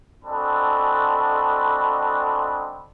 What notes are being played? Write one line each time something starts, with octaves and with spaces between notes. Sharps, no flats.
G#3 C4 D4 F#4 A4 B5